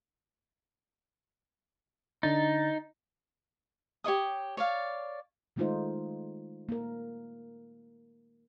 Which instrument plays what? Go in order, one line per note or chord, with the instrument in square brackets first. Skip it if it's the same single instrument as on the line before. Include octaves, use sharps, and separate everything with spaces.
[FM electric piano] D3 D4 A6 [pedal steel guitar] D#4
[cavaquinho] G4 C#5 D#5 D#6
C#5 D5 F5
[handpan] D#3 G#3 A3 D#4 F4 C5
A#3 A#4